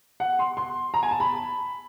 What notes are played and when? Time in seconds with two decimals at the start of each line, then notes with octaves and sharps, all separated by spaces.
0.20 F#5
0.39 C6
0.57 C6
0.94 A#5
1.03 G#5
1.11 A5
1.20 B5